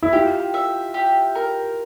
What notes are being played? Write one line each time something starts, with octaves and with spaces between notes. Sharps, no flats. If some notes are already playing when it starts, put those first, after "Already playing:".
E4
F4 G4
E5
G4
A#4